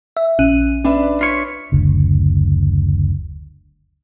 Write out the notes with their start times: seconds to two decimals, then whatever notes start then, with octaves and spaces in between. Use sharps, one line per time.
0.17 E5
0.39 A#1 C#4 F#6 D#7
0.84 C#4 D4 B4 E5
1.21 F4 C#5 B6
1.72 F#1 D2